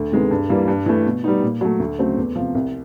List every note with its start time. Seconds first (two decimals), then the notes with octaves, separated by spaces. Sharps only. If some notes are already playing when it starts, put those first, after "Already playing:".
Already playing: D2
0.11 C3 D#3 G#3 B3
0.31 G2
0.49 E3 G3 A#3
0.68 G2
0.86 E3 A3
1.06 B2
1.24 G3 B3 D#4
1.42 A#2
1.61 F#3 A3
1.80 D2
1.99 C#3 F#3 A3 C4
2.17 E2
2.36 C3 F3
2.55 C2